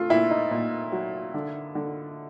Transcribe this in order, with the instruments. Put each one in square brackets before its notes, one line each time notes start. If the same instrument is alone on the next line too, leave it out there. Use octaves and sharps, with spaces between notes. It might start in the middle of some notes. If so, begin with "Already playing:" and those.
Already playing: [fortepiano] A3 [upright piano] F4
[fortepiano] A#2 [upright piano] E4
[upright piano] D#4
[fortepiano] A#2
F#3
D3
D3